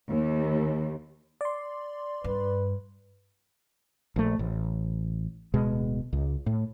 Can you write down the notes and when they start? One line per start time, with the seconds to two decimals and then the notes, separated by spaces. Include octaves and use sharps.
0.10 D#2
1.41 D5 C6
2.24 G2 B4
4.16 A#1 A3
4.39 A1
5.54 D1 B2 G#3
6.13 C#2
6.46 A2